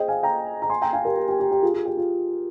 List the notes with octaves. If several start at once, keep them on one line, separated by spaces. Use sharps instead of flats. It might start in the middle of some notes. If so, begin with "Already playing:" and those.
Already playing: G#4 C5 D#5 G5
F5 G#5
G5 A#5
A#5
G#5 C6
G5 A#5
F5 G#5
G4 A#4
G4
G4
G4
G4
F4 G#4
F4
G4
F4